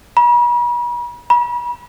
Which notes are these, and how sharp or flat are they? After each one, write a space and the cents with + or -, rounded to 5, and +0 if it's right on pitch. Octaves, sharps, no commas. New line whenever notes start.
B5 -45
B5 -40